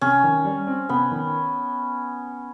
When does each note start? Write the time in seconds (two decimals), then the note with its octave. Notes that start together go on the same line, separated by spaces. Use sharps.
0.01 C3 C#4
0.24 D#3
0.45 G3
0.67 C4
0.89 C3 B3
1.11 D#3